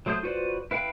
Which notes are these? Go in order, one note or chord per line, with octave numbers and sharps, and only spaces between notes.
F#3 A3 C5 D#6 G6
F4 F#4 B4 C5 D5
E4 B4 F5 G5 B5